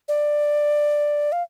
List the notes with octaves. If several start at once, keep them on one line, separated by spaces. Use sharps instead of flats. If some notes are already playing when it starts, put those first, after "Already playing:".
D5
F5